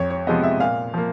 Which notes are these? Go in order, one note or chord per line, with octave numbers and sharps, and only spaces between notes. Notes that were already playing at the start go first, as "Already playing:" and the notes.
Already playing: F2 C#5
C#5
C3 F3 G#3 B3 D#5
E5
A#2 F5
F3 A#3